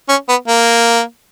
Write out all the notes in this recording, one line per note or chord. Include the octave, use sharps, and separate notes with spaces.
C#4
B3
A#3